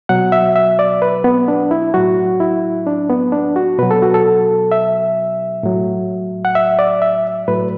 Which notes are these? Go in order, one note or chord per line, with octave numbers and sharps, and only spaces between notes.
B2 F#3 F#5
E5
E5
D5
B4
B3
D4
E4
A2 F#3 F#4
E4
D4
B3
D4
F#4
B2 F#3 B4
A4
F#4
A4
E5
A2 F#3
F#5
E5
D5
E5
A2 F#3 B4